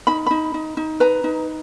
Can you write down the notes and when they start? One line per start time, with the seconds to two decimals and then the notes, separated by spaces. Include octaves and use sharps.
0.07 D#4 B5
0.26 D#4 B5
0.54 D#4
0.77 D#4
1.00 B4 A#5
1.24 D#4